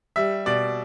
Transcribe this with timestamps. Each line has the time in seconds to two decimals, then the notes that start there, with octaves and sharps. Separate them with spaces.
0.16 G3 E5
0.46 B2 D5